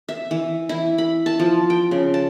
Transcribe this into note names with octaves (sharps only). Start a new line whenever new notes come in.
E5
E3
E4
B5
A5
F3
G5
C#3
A5